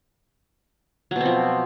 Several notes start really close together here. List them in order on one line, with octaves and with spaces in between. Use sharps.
F#3 B2 C4 F3